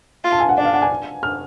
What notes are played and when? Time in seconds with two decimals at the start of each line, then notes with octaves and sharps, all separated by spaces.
0.24 F4
0.32 A5
0.40 G#5
0.49 F#5
0.58 D4 D5
0.65 F5
0.73 F#5
0.82 G#5
1.23 F6